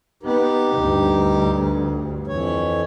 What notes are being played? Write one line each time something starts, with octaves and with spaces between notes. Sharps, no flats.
B3 D#4 G4
D2 G2
F2 E3 C#5